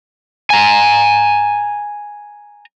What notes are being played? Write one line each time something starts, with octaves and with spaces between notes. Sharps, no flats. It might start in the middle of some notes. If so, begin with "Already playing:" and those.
G#5 A#5